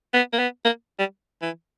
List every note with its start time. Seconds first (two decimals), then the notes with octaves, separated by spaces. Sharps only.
0.13 B3
0.33 A#3
0.39 B3
0.65 A#3
0.99 G3
1.42 E3